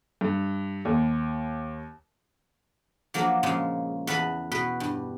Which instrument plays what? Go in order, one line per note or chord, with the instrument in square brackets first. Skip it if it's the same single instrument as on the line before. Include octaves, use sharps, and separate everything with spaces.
[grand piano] G2
D#2
[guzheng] F3 F#3 A#3 D4
A#2 C#3 F3 G#3
E2 B4 A5 B5
B2 B4
G2